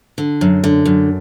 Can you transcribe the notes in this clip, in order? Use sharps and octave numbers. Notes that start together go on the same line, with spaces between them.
D3
F#2
D3
F#2